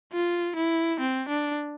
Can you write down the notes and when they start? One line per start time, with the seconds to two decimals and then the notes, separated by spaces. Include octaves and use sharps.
0.13 F4
0.56 E4
1.00 C4
1.29 D4